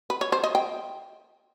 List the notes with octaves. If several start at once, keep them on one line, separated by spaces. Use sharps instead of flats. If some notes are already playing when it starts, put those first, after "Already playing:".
B4
C#5
C5
D#5
G5